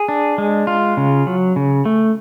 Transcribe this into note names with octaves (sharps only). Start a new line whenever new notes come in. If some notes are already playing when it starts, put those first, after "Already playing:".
Already playing: G#4
D4
G#3
F4
C#3
F#3
C#3
A3